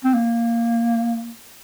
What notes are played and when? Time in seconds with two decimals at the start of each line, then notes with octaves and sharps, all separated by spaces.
0.04 C4
0.14 A#3